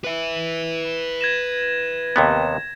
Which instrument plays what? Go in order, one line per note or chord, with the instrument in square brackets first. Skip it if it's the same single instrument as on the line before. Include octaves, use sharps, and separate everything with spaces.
[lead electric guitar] B4 E5
[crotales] G#6 A#6 E7
[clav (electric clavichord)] D#2 C3 B3